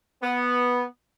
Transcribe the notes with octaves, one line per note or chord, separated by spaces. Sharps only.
B3